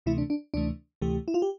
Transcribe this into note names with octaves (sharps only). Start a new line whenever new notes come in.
D2 C3 E3 A3 E4
D4
D4
D2 C3 E3 A3 D4
D2 C3 E3 A3 G4
E4
F4
G4